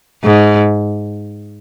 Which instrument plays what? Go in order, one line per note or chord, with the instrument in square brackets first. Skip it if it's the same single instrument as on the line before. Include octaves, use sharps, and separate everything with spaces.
[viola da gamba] G#2